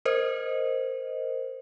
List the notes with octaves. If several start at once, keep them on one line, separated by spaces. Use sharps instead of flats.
A#4 C5 D#5